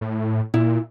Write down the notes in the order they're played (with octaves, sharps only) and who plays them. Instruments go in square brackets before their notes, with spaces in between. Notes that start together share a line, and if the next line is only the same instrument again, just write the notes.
[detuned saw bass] A2
[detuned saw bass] A#2 [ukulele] E4